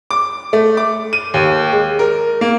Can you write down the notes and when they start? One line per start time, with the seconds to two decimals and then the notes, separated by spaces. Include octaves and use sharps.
0.11 D6
0.53 A3
0.77 D6
1.13 D#7
1.34 D#2
1.72 G#3
1.99 A#4
2.41 A#3